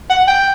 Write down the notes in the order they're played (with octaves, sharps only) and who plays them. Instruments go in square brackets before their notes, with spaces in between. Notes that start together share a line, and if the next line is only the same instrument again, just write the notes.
[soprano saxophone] F#5
G5